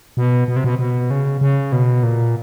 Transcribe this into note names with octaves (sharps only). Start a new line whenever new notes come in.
B2
B2
C3
B2
B2
C#3
C#3
B2
A#2